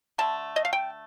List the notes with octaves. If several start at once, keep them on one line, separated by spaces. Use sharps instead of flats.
D3 A3 A5
D#5
F5
G5